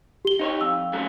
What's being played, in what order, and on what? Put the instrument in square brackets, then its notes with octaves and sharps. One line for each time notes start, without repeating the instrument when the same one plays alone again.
[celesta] G4 G7
[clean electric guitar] D#4 C5 C#5
[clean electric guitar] F2 [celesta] E6
[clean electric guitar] F#2 F#3 A3